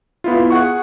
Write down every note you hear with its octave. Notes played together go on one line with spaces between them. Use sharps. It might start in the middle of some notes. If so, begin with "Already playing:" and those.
B3 E4 F4
G#4 F#5 C#6